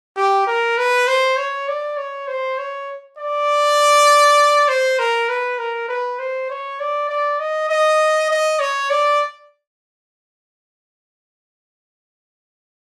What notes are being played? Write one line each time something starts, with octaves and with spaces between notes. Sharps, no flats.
G4
A#4
B4
C5
C#5
D5
C#5
C5
C#5
D5
C5
A#4
B4
A#4
B4
C5
C#5
D5
D5
D#5
D#5
D#5
C#5
D5